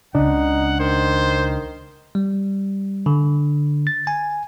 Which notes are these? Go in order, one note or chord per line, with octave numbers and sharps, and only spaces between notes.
C#2 C#3 D4 D#4 F#5
D#3 C5
G3
D3
A6
G#5